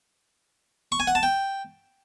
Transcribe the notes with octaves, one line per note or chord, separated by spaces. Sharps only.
C#6
G#5
F#5
A5
G5